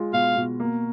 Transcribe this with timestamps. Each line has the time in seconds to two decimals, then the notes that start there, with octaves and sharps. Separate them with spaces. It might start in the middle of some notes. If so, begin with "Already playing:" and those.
Already playing: G#3 F4
0.13 B2 F5
0.36 B2
0.60 A#3